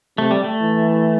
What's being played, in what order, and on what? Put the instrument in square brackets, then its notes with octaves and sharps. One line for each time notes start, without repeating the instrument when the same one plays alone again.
[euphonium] C3 [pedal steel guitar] A3
[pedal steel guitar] G3
A3
[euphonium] E3